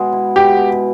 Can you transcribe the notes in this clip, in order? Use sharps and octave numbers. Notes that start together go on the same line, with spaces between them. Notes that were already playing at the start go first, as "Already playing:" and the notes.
Already playing: B2 G#3
E4
B2 G4
B2